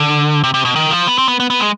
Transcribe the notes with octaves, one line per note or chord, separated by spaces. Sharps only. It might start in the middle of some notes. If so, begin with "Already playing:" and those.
Already playing: D3
C3
C3
B2
D#3
F3
B3
C4
B3
B3
B3
G#3